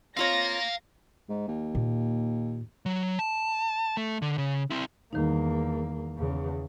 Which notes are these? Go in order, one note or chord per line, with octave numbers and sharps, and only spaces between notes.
C4 F4 C#5 F5 A#5 A#6
G#2
D#2
A#2
F#3
A5
A3
D3
C#3
C4 E4
E2 D#3 G3 A#3 D#4
E2 C#3